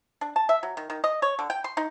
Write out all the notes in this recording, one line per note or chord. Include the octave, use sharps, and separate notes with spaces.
D4
A5
E5
F#3
D#3
D#3
D#5
C#5
D3
G5
C6
D#4